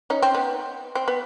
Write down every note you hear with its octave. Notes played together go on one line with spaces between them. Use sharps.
C#4 D#4
C4
B3
C4
B3